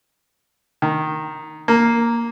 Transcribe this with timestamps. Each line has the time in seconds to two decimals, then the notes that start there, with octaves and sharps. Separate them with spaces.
0.82 D#3
1.68 A#3